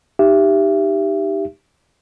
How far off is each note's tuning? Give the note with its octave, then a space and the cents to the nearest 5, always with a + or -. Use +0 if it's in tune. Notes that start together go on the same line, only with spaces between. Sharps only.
D#4 -10 G4 +0 E5 +25